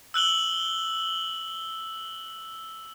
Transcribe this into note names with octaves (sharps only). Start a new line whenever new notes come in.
E6 F#6 F#7 G7